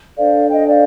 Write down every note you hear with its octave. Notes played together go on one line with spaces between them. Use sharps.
D4 A4 C5 D5 F5
D#5 G5
D5 F5